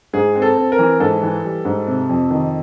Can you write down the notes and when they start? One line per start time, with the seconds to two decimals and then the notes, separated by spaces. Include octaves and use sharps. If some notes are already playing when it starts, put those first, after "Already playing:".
0.13 G#2 G#4
0.36 C4
0.42 A4
0.57 C4
0.72 A#4
0.79 E3
1.00 G#2 A4
1.22 E3
1.44 G3
1.65 G#2
1.87 C3
2.09 F2
2.30 D#3